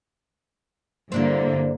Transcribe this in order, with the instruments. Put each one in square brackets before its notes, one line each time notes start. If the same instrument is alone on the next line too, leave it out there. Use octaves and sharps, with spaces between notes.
[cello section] G2 D3 A#3 [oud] C4 D4 E4